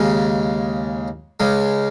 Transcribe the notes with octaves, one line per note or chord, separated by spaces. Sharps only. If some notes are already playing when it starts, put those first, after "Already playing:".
Already playing: D#2 C#3 G#3
C#2 C#3 G#3